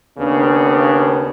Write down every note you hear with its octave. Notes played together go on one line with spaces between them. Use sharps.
D#2 C#3 B3 D4